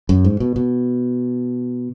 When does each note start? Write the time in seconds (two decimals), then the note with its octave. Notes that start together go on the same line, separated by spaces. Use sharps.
0.09 F#2
0.24 G#2
0.40 B2
0.56 B2